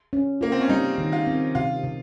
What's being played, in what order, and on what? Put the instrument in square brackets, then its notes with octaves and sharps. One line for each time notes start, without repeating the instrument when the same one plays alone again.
[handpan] C#4
[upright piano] A#3 [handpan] F4
[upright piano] C4
C#4
[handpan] G3 [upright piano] D#4
[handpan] D#3
[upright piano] F4
[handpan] C4
[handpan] C3 [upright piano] F4
[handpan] C3